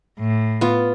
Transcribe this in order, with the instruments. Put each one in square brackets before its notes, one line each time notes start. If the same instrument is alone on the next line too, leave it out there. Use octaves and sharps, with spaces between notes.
[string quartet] A2
[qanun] B3 F4